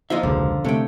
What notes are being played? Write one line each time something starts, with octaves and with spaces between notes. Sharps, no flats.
F3 A#3 F4 D#5 E5
E1 C#2 D3
C3 A3 C#5 G5